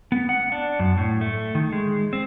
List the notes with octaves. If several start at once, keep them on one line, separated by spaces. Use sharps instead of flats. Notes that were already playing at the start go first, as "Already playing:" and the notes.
B3
F#5
D4
F#2
A2
A3
D#3
G#3
C4